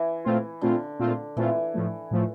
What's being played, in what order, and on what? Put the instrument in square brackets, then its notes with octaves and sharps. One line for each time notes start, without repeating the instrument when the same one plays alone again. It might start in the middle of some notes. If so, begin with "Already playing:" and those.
Already playing: [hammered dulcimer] E3
[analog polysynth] A#2 A3 C4 F4
[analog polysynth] A#2 A3 C4 F4 [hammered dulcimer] D3
[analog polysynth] A#2 A3 C4 F4
[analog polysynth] A#2 A3 C4 F4 [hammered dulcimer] E3
[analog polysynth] A2 F3 A3
A2 F3 A3